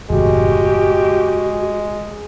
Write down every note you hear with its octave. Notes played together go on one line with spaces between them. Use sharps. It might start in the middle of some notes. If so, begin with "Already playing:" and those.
F#1 E2 A2 G#3 F#4 G4